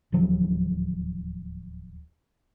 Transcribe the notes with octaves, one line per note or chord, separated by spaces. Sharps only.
D1 D#2 F3 F#3